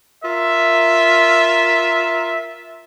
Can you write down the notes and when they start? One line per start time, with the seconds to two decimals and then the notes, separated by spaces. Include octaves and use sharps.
0.24 F4 A#4 E5